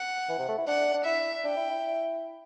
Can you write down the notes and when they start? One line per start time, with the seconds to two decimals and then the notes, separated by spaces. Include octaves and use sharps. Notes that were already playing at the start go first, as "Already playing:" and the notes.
Already playing: F#5
0.29 E3
0.39 C3
0.48 A3
0.58 E4
0.67 D4 F#5
0.94 D4
1.05 E4 E5
1.44 D4 G5
1.57 E4
1.70 E4